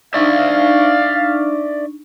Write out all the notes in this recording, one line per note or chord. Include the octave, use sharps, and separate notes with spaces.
D4 D#4 D5 E5 F5 C#6